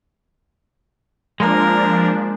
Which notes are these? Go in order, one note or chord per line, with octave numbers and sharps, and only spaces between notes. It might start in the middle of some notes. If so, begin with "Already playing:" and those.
F3 G#3 A#3 D4 A#4